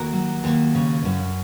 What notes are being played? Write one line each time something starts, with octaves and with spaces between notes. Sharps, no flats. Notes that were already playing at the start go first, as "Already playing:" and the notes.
Already playing: D#2 F#4 A#4
F#3
D#2
C#3
F#2